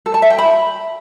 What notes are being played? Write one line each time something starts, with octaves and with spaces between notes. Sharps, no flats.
A4
A5
E5
G5
B5